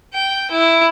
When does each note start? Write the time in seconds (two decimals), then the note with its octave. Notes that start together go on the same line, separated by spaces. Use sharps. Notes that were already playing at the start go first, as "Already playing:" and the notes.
0.14 G5
0.51 E4